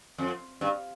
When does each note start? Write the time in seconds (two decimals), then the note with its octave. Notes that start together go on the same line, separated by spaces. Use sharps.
0.18 F2
0.61 G2